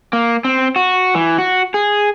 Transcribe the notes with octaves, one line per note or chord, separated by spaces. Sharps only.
A#3
C4
F#4
E3
F#4
G#4